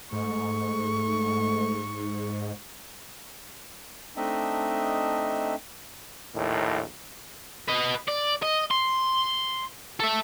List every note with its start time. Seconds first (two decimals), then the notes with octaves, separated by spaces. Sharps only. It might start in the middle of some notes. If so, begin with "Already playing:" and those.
0.13 G#2 A3 C#6
4.17 A3 C4 D4 D#4 D#5 E5
6.35 A#1 D#2 A2
7.68 B4 D#5
8.08 D5
8.43 D#5
8.71 C6
10.00 A4 E5